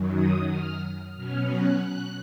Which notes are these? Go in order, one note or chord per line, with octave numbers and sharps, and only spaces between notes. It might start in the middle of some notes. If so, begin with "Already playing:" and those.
Already playing: F#2 D#3 F#3
D#6
F6
B2 F#3 C#4 F6
F#6
F#6